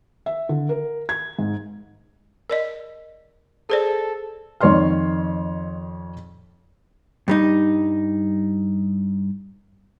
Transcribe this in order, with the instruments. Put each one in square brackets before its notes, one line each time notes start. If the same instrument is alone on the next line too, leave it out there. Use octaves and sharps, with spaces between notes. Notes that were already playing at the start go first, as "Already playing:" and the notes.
[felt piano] E5
D3
A#4
G#6
G#2
[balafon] A#4 D5 D#5
[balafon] G#4 C5 D5 [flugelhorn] A4
[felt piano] F2 D#3 C#5 D5 C6 F6
[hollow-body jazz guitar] G2 G3 D#4